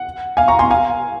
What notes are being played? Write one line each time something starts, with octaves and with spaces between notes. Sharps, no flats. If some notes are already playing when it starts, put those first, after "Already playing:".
Already playing: F#5
F5 G#5
A#5 C#6
G#5 C6
F5 G#5